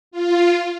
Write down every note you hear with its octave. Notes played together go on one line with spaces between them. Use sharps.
F4